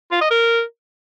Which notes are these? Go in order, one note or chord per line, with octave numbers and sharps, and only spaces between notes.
F4
D#5
A#4